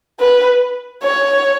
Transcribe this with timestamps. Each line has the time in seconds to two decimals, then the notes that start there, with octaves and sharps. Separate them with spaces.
0.20 B4
1.03 C#5